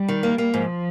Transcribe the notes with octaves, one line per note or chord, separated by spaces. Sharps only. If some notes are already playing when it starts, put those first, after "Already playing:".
Already playing: G3
D#3
A#3
A#3
G#2 F3